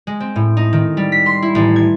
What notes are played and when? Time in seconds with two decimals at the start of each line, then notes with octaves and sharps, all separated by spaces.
0.07 G#3
0.20 C4
0.36 A2
0.57 D#4
0.73 D#3
0.97 G3
1.12 B6
1.26 C6
1.42 E4
1.55 A1
1.76 G#6